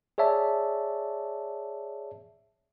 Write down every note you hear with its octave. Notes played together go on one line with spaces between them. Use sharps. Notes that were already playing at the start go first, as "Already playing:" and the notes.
G#4 C#5 D5 E5 A5